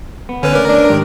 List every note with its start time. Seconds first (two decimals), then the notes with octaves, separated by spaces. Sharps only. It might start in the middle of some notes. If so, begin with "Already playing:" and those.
0.29 B3
0.43 D3 C#4 B4
0.55 A3 A#4 D5
0.69 D4
0.90 G#2 D#3 G4